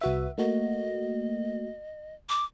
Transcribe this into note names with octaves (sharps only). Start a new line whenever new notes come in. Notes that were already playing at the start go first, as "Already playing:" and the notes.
C2 F#4 B4 E5
A3 A#3 F#4 D#5
D6